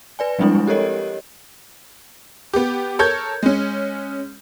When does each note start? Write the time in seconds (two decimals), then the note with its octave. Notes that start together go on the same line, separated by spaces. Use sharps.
0.19 B4 D5 G#5
0.39 F3 G3 G#3 C4 D4 E4
0.55 G#3
0.67 G4 A4 A#4 C#5 D#5
2.53 B3 G4
2.99 A4 A#4 C#5 G6 G#6
3.43 G#3 C#4